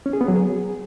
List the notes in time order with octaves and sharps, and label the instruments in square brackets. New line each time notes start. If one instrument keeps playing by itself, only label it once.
[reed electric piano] C#4
G#4
B3
F#3
G#4